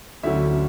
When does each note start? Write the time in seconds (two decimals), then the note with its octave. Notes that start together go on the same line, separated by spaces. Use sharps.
0.23 D2 D3 F#3 C#4 E5